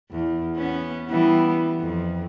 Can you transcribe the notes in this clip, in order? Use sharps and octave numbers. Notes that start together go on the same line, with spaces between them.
E2
B3 C#4
E3 G3 B3
F2